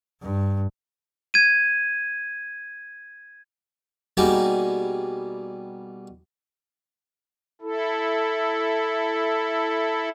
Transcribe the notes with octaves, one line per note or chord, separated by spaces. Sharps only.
G2
G#6 D#7
B2 G3 A#3 D#4 G#4
E4 A4